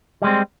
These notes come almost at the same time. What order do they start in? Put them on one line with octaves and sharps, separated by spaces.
G3 G#3 C4